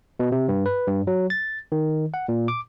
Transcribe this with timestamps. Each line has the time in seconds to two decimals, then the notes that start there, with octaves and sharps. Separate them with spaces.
0.19 B2
0.32 C3
0.48 G2
0.66 B4
0.88 G2
1.07 F#3
1.30 A6
1.72 D#3
2.14 F#5
2.28 A#2
2.48 D6